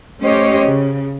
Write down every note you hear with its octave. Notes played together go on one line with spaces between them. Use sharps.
A3 C#4 G4 C5 C#5 D#5
C#3